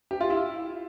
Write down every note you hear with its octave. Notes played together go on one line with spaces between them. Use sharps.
G4
F4
E4